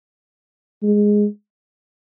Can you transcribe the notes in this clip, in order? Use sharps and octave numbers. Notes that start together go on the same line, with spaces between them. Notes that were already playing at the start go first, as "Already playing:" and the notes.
G#3